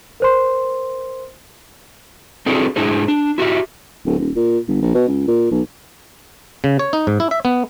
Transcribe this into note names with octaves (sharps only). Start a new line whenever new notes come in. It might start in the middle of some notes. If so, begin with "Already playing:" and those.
A#4 C5 C6
C4 D4 E4 F#4 G#4 A4
G#2 D4 E4 G#4 C5
D4
E4 F#4 G4 E5
D1
D#1
A#2
G1
A#1
B2
C#2
A#2
B1
C#3
C#5
D#4
G#2
E4
E5
B3